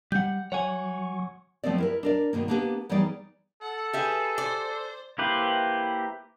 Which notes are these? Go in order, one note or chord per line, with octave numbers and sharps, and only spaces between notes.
G3 F#5 G6
F#3 C#5 F#5 G#5 C#6
F3 A3 B3 C4 D5
E4 A#4 B4
D4 A#4 D5
G#2 B2 D#3 A#3
A#3 B3 D4 G4 G#4 B4
E3 G3 B3 D#4 G#4 D5
A4 F#5
G4 G#4 B4 E5
C5 D5
A#3 E4 G4 B4 C5